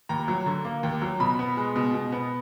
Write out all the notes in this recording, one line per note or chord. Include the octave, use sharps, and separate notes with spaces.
D#2 A#5
F#3
D3
A#3
D#2
F#3
B2 B5
B3
G#3
B2
B2
B3